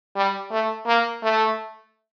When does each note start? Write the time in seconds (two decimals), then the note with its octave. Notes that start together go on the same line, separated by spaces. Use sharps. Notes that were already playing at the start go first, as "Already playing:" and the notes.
0.16 G3
0.51 A3
0.86 A#3
1.23 A3